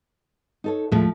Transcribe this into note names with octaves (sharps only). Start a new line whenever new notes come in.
D#4 A4 C#5
D#1 A2 F3 G#3 A3